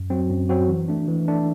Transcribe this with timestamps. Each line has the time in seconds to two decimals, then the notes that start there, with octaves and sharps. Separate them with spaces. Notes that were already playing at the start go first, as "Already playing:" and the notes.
Already playing: F#2
0.10 F#3 C4 F#4
0.31 F#2
0.49 F#3 C4 F#4
0.69 E3
0.88 A3 D4
1.08 E3
1.28 A3 D4